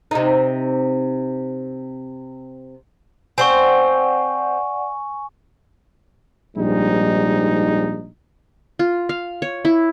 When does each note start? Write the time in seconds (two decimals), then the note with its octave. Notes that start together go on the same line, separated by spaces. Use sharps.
0.11 C3 D#4
3.38 C4 C5 D5 F#5 G#5 C#6
6.57 A#1 G#2 G3 D#4
8.79 F4
9.09 F5
9.42 C#5
9.65 E4